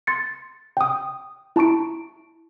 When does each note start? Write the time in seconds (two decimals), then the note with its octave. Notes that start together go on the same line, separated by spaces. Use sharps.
0.07 C6 A6 C#7
0.77 G5 D#6
1.56 E4 A5 A#5 C#6 D7